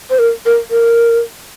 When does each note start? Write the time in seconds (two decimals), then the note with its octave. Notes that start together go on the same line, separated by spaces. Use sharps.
0.10 C5
0.19 A#4
0.46 A#4
0.71 A#4